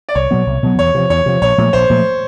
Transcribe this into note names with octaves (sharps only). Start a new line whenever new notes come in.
D5
C2 C#5
B2 F#3 B3
C2
B2 F#3 B3
E2 C#5
C3 F3
E2 C#5
C3 F3
A#1 C#5
A#2 F3 A3
A#1 C5
A#2 F3 A3